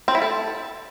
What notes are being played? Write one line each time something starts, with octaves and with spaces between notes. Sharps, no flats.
C4
E4
A4